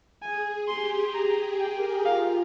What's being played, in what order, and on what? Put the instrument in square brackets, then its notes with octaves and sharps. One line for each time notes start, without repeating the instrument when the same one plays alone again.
[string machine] G#4 [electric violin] G#5
[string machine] G4 [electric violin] C6
[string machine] G#4 [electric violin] A#5
[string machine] G#4
[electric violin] G5
[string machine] A#4
[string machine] F4 [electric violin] F5